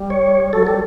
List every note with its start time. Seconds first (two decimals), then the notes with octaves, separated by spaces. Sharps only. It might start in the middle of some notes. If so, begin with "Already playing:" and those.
Already playing: G3
0.10 C#5
0.53 F#3 A4
0.66 G3 A4